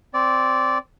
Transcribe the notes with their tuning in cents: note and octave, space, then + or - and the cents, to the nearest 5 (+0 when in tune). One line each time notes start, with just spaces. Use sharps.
C4 +0 D5 -15